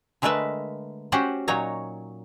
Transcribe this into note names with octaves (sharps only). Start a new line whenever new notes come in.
D3 G#3 A3 A#4 B4 E5
C#4 F#4 G4 C5 F#5
A#2 F#3 D#4 C#5 A#5